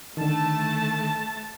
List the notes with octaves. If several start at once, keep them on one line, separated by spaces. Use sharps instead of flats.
D3 D#3 A3 A5